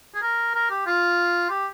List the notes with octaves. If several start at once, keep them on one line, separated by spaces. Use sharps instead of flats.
G#4
A#4
A#4
G4
F4
G4